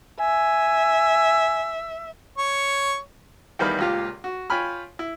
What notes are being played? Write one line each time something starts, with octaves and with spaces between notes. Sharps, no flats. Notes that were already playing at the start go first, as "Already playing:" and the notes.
E5 G#5
C#5
E2 D#3 G3 B3 F5 B5
C#2 A#2 F4 G4 F5
F#4
F4 C#5 G5 G#5 B5 F6
E4